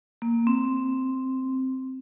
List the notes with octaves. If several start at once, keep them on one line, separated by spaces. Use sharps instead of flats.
A#3
C4